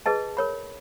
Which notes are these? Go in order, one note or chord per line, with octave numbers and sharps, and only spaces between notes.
G#4 B4 D#5 A5
A#4 C#5 B5